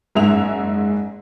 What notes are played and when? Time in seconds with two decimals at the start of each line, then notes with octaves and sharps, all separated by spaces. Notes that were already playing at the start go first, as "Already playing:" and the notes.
0.15 F#1 G#2 G#4 E5 F7